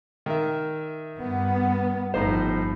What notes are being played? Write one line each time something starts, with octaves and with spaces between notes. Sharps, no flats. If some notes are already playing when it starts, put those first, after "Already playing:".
D#3 E5
G2 B3
G1 A2 F3 D#4 C5